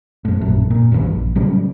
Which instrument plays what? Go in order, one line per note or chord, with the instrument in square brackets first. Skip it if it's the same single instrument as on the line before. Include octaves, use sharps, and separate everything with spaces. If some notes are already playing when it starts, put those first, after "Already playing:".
[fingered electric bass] F#2 A2
A#1 F#2 A2
A#2
E1 A#1 G2 E3
A#1
A2 C#3 F#3 G3